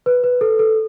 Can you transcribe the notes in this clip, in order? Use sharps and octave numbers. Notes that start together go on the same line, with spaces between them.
B4
B4
A4
A4